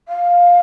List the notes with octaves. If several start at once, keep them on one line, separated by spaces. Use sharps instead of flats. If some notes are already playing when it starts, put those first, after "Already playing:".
F5